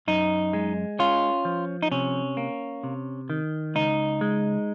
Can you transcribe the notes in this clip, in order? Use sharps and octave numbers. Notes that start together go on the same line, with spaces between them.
F#2 D#4
G#3
C#4 F4
F3
D#4
C3 C#4
A#3
C3
D#3
C#2 D#4
G#3